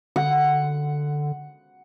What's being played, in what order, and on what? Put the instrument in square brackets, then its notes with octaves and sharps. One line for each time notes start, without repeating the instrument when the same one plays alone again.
[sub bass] D3 [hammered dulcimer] F#5